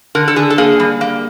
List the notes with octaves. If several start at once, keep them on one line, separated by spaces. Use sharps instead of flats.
D3 A#4
A4
D3 G#4
A4
A#3 G#4
G3
A#3